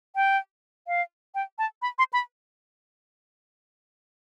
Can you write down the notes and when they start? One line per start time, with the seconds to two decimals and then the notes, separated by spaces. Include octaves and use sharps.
0.16 G5
0.87 F5
1.35 G5
1.58 A5
1.82 B5
1.98 C6
2.13 B5